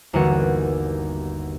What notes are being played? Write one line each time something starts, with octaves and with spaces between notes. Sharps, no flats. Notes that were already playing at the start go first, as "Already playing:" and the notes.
G1 D#2 E3 B3 F#4 F#6